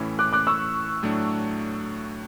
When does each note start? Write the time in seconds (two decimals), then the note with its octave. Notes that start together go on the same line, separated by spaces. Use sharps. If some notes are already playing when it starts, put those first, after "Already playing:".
Already playing: A2 E3 A3 C#4 E4
0.19 D6 F#6
0.33 D6 F#6
0.47 C#6 E6
1.03 A2 F#3 A3 D4